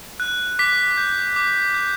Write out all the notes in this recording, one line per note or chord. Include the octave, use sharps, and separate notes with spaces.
F#6
D6 B6
G6
D6
G6